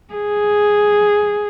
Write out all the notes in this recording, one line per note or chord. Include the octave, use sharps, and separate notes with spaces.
G#4